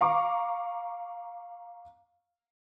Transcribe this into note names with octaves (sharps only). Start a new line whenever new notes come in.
F5 A#5 C#6 D6